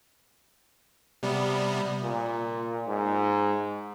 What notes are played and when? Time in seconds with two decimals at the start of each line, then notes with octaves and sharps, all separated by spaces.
1.23 C3 G3 B3
2.03 A#2
2.88 G#2